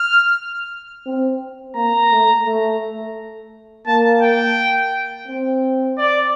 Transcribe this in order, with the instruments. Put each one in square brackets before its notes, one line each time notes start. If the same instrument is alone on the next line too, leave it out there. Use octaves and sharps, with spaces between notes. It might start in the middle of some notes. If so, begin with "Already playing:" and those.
Already playing: [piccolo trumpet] F6
[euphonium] C4
[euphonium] A#3 [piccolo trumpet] A#5
[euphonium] A3
A3
[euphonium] A#3 [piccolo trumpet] A5
[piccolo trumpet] G5
[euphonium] C4
[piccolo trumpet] D5